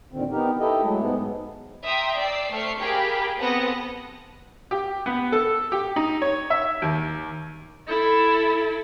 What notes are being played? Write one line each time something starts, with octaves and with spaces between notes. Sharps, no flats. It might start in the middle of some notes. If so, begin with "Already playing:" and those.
F2 A#2 D3 D#3 C4
B3 D#4 G4 A#4
E4 G4 A4 D#5
F#3 G#3 A3
G#2 G#3 B3
E5 G5 A#5 C6 D#6
D5 E6 C7
A3 C5 C#6 F6 C7
G4 G#4 A#4 F5 G5 B5
B3 C4 A4 F#5 D#6 A#6
G4
B3
A4
G4
D#4
C#5
E5
D#2
E4 A4